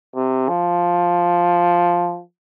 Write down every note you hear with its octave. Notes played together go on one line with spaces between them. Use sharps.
C3
F3